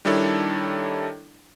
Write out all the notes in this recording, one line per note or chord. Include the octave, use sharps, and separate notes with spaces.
D#3 G3 D4 E4 A4 C#5